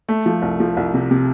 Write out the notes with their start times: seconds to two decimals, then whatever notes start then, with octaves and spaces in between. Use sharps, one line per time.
0.09 A3
0.26 F3
0.42 C2
0.60 F3
0.77 C2
0.94 C3
1.11 C3